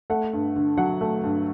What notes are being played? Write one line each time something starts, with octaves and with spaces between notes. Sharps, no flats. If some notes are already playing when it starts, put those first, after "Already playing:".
A3 F#5
G2
D3
F#3 F#5
A3
G2